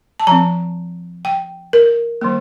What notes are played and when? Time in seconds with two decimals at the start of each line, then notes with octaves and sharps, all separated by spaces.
0.20 A5
0.27 F3 C4 A#5
1.25 G5
1.73 A#4
2.21 D#3 G3 A#3